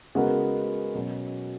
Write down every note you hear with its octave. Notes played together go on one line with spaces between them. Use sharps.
C#3 G#3 B3 F#4 A#4
B2 F#3 C#4